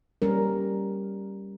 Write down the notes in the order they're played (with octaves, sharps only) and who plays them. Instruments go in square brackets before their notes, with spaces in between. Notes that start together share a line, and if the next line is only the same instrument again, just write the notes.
[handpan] G3 C#4 A#4